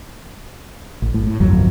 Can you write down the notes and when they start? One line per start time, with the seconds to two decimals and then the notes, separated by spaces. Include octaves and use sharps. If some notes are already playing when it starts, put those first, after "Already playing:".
1.02 A1
1.14 G#1 A2
1.26 A2
1.40 G1 C2 F2 F#3